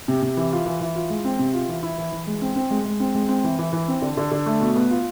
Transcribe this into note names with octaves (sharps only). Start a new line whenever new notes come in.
C3
C3
E3
F4
E3
E3
F4
G#3
C4
C3
F4
E3
E4
E3
E3
G#3
C4
C4
G#3
G#3
C4
G#3
C4
E3
E3
E3
C4
D3
D3
D3
A3
B2
B3
F4